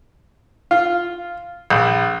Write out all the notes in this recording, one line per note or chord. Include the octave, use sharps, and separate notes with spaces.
F4
A#1